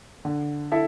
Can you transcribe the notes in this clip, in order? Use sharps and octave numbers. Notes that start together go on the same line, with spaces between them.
D3
E4 A4 E5